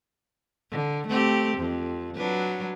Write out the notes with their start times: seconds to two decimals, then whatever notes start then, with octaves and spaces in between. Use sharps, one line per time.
0.71 D3
1.07 A3 C4 G4
1.58 F2
2.15 F#3 D4 B4